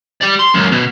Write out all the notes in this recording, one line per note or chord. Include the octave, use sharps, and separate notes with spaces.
G4 D5
C6
C#2 F#2
B2